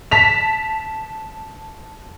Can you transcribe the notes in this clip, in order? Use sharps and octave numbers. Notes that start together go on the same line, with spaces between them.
A5 B6 F7